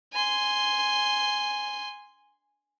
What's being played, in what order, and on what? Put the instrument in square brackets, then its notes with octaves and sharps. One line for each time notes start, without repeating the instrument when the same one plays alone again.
[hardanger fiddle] G#5 C6